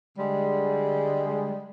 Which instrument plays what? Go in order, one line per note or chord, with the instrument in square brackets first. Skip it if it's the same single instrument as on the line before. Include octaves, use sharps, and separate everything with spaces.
[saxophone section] D3 G3 G#3